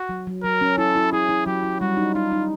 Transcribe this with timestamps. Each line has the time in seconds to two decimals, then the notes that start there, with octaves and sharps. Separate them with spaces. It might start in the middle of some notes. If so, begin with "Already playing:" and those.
Already playing: F#4
0.09 F#3
0.27 F#3
0.43 F#3 A#4
0.61 C#4
0.78 E4 A4
0.96 E4
1.13 E4 G#4
1.29 E4
1.46 F#3 G4
1.63 E4
1.81 G3 F#4
1.97 D#4
2.15 D#4 F4
2.32 D#4